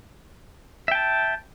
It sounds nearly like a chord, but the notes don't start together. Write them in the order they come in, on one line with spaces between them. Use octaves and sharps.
E5 G5 A5